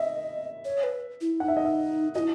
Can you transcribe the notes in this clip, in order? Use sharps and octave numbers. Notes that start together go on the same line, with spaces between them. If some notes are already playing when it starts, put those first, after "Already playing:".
Already playing: D#5 E5
C#5
B4
E4
D#4 F#5
E5
D#5
E5
E4 F#4 D#5